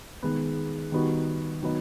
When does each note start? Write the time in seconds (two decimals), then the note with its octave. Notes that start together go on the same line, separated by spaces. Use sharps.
0.23 D#3 G#3 B3
0.92 D#3 G3 B3 D#4 F#4
1.63 D#3 F#3 B3 D#4